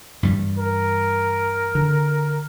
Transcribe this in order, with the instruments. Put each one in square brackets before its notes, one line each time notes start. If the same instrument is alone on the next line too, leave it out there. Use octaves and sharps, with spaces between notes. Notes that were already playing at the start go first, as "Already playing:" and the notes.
[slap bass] G2 E3 G3
[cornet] A#4
[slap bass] D3